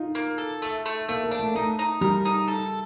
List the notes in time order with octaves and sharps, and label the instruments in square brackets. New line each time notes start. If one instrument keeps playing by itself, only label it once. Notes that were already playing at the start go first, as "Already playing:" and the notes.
Already playing: [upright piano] D#4 F4
[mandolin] A#3
A4
A3
A3
[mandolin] A3 [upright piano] A#3
[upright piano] A#3
[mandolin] D4
[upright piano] A3
[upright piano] A3 [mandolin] D#4
[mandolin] D#4
[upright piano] G3 [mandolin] A#4
[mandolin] D#4
A4